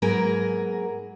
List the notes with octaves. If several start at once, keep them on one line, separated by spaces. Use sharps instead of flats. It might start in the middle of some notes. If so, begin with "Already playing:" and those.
G#2 F#3 A#3 G#4 A#4 B4